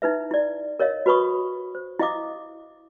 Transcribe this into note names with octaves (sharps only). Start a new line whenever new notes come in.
D#4 E4 B4 E5
E4 D5
A#4 C#5 D#5 F5
F#4 B4 B5 C#6 D#6
C5
E4 D#5 F5 D6 D#6